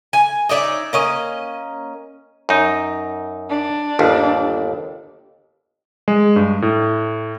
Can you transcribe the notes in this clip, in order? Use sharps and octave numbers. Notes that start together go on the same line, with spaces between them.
G#5
D#4 C#5 D5 E5
A#3 C#4 D#5
F#2 D#4
D4
G1 D#2
G#3
G2
A2